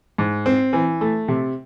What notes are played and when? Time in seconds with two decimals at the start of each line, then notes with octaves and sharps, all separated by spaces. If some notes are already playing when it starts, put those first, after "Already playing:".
0.18 G#2
0.46 C4
0.73 E3
1.01 A3
1.28 C3